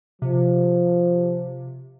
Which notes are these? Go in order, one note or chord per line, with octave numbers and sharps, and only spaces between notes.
C3 F3